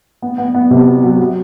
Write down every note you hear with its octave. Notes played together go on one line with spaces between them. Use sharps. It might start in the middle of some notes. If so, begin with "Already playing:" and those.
B3
B3
B3
C3
F#4
F#3
F#3